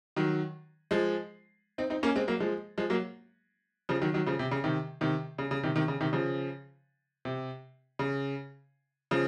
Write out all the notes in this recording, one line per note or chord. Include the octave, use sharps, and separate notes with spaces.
D#3 F#3
F3 G#3
C4 D#4
C4 D#4
A#3 C#4
G#3 C4
F#3 A#3
F3 G#3
F3 G#3
F#3 A#3
C#3 F3
D#3 F#3
D#3 F#3
C#3 F3
C3
C#3
C3 D#3
C3 D#3
C#3
C#3
C3 D#3
C3 D#3
C#3
C3 D#3
C#3 F3
C3
C#3
C#3 F3